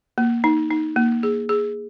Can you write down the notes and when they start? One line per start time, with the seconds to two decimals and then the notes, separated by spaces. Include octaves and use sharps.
0.18 A#3
0.44 D#4
0.71 D#4
0.96 A#3
1.23 G#4
1.49 G#4